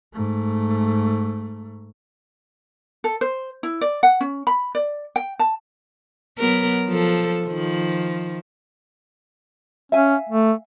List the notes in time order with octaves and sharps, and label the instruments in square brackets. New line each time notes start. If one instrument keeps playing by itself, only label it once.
[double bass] G#2 A3
[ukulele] A4
C5
E4
D5
F#5
C#4
B5
D5
G5
A5
[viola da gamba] F#3 B3 A#4
F3 A4
D#3 F3
[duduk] C#4 [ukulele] E5 F5 G#5
[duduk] A3